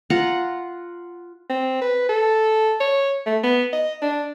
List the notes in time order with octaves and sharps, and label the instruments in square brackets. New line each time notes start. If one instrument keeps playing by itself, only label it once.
[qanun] F4 F#5 A#5
[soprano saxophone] C4
B4
A4
C#5
A3
B3
D#5
D4